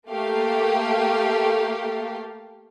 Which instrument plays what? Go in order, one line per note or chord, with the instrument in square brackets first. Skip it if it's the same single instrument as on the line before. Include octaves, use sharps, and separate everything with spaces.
[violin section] A3 A#3 G4 F5